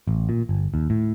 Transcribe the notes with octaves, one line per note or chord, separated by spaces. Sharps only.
A1
A#2
G1
D#2
A2